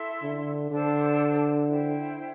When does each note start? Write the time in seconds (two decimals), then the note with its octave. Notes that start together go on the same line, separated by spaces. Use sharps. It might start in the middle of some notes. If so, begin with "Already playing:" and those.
Already playing: E4 A4 E5 C6
0.22 D3
0.70 D3 D4 A4 C5 A5
1.68 E4 C5 G5